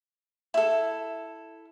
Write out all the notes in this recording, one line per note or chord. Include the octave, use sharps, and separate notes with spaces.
E4 A4